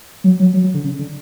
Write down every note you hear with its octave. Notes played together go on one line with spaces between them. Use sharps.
F#3
F#3
F#3
F#3
D3
C#3
D3